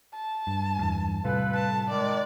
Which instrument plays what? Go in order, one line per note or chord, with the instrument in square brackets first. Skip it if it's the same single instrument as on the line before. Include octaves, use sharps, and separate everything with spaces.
[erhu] A5
[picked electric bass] G2
E2 G2
[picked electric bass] A2 C3 G3 [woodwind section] F4 A4 B4
[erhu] A5
[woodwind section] D#3 G#3 [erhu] D5